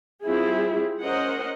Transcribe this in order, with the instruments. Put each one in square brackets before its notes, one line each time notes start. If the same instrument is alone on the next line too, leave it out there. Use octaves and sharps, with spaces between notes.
[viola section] G3 C4 E4 F4 G#4
C#4 A#4 C5 D#5 F#5